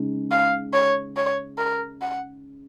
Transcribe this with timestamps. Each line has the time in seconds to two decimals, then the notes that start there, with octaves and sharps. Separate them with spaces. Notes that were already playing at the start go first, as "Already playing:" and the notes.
Already playing: C#3 G#3 D#4
0.31 F5
0.73 C#5
1.17 C#5
1.58 A#4
2.02 F#5